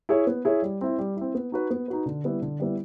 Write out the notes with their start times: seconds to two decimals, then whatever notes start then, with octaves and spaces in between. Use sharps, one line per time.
0.09 E4 G#4 C#5 E5
0.27 B3
0.45 E4 G#4 C#5 E5
0.62 G3
0.81 C4 E4
0.99 G3
1.17 C4 E4
1.35 B3
1.52 D#4 F#4 B4
1.70 B3
1.88 D#4 F#4 B4
2.06 D3
2.24 G3 B3 E4
2.42 D3
2.60 G3 B3 E4